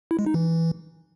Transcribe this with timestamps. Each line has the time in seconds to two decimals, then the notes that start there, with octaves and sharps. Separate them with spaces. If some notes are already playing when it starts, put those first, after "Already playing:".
0.11 E4
0.19 G#3
0.26 D#4
0.34 E3